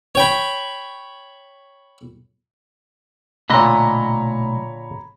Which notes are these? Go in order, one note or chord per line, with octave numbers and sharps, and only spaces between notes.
C#5 G5 B5
B1 A#2 D3 A3 C#5 D#5 A#5 B5